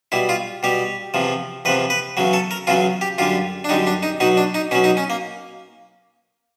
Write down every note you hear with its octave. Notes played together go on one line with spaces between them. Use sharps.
B2 G3 E4
F4
B2 G3 G4
E2 C3 F3
E2 C3 F3 B4
B4
E2 C#3 F#3
A4
A#4
E2 C#3 F#3 F4
G4
F#2 D3 G3 F4
D4
F#2 D3 G3 D#4
D4
D#4
B2 F#3 D#4
D4
D#4
B2 F#3 C#4
D#4
C#4
A#3